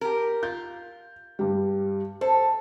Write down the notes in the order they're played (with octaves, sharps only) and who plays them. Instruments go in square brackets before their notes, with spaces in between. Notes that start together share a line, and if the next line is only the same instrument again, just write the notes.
[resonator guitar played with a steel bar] G4 A#4
[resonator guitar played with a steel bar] F4 [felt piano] G6
[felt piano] G2 G3
[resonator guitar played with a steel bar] A4 [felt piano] C5